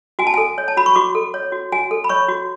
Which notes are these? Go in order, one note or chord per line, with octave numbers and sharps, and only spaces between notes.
F#4 G#5
A5
A4 G#5
C#5
A5
F#4 B5
C#6
F#4 D6
A4
C#5
F#4
F#4 G#5
A4
B5
C#5 C#6
F#4